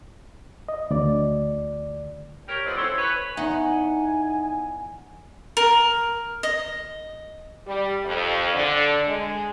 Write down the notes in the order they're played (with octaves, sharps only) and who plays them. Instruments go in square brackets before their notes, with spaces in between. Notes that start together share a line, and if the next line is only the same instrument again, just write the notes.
[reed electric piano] D#5
D2 D5
[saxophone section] G4 A#4 C#5
A2 F3 B3 C4 D5 D#5
C#4 E4 F#4 A4 C5 C#5
B4 C#5
[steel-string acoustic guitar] E2 D#4 F#5 [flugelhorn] G#5
[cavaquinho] A#4
D#5
[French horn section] G3
F2
D3
G#3